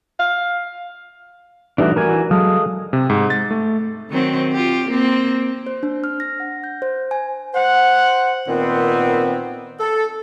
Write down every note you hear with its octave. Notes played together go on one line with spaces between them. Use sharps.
F5
E3 G3 A3 D4 D#4 F#4
E3 F#4 A#4 D5 G#5
F#3 G#3 A4 F5 D#6
C3
G#2
A6
A3
D#3 F#3 C4
F4 G4
A#3 C4
C5
D4
F6
A#6
F#5
G6
C5
G#5
C5 F#5
A#2 D#3 B3 C4
A4